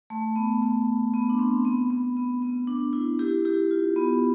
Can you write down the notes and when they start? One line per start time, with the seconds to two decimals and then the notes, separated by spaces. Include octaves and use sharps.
0.10 A3
0.36 B3
0.62 B3
1.14 B3
1.30 D4
1.39 C4
1.65 B3
1.90 B3
2.17 B3
2.42 B3
2.67 D4
2.93 E4
3.19 E4 G4
3.45 E4 G4
3.71 F4
3.96 B3